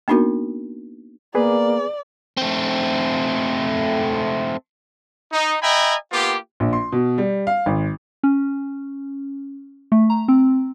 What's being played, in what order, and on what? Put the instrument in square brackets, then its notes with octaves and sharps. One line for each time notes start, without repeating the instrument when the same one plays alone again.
[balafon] A#3 B3 D4 D#4 F#4 A#4
[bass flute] A#3 [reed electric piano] B3 G#4 B4 [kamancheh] D5
[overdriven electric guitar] A3 C4
[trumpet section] D#4
D#5 E5 G5 G#5 A#5 B5
A#3 B3 F4 G4
[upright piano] A#1
C6
B2
G3
F5
G#1
[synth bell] C#4
A3
A#5
C4